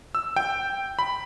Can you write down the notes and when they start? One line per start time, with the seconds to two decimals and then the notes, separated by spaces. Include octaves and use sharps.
0.15 E6
0.36 G5
0.99 B5